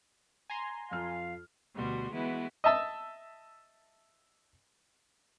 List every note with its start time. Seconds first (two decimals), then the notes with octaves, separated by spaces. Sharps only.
0.50 G#5 A#5 C6
0.91 F2 F4 F5 F6
1.74 D2 B2 G3 F#4 C6
2.12 E3 G#3 B3 E4 F#4
2.64 D#5 E5 A5 E6